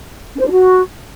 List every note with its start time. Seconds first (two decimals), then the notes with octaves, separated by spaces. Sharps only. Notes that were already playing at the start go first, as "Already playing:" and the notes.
0.35 C#4
0.40 C5
0.46 D4
0.51 F#4